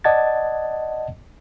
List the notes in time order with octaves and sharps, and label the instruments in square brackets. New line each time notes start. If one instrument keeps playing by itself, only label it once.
[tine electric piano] D5 D#5 F#5 A5 G#6 A6